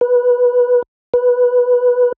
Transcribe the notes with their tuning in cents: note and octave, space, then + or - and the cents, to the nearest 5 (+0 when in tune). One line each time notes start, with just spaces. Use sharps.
B4 -10
B4 -5